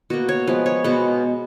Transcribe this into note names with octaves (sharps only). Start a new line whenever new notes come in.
B2 A#3 F#4
C#5
F3 G#3 B3 B4
C#5
B2 G#3 B3 F#5